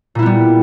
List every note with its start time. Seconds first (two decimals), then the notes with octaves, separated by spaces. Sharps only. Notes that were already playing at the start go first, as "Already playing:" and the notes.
0.15 A#2
0.19 E4
0.22 B3
0.26 G3